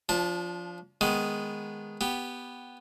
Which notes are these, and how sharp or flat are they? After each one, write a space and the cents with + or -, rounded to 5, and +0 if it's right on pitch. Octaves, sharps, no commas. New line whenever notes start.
F3 +0 D4 -35 A5 +0
D#3 +0 G#3 +0 B3 +0
B3 +0 G4 +0